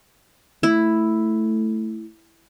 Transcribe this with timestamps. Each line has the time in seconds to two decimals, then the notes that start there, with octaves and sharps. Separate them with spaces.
0.63 A3 E4